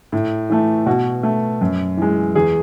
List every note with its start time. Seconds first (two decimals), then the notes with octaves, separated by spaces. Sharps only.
0.12 A2
0.50 E3 A3
0.86 B2 F#4
1.23 A3
1.61 F#2
1.97 E3 G#3
2.35 E2 G#4